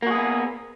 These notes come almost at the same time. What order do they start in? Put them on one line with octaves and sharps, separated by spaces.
A#3 F#4 G#4 B3